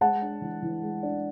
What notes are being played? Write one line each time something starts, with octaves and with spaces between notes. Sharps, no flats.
G#3 F#5 A5
D4
E3
E3
G#3
D4